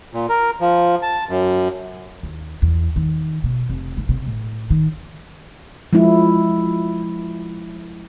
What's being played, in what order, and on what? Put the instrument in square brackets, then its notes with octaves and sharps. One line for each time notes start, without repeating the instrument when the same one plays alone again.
[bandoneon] A#2
A#4
F3
A5
F#2
[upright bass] D#2
E2
D#3
B2
F1
D#3
C3
A2
D#3
[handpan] F3 G#3 E4